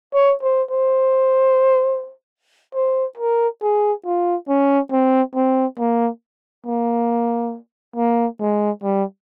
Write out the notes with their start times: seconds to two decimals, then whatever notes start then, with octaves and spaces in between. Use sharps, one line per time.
0.14 C#5
0.43 C5
0.71 C5
2.75 C5
3.17 A#4
3.62 G#4
4.06 F4
4.49 C#4
4.92 C4
5.36 C4
5.79 A#3
6.66 A#3
7.96 A#3
8.40 G#3
8.83 G3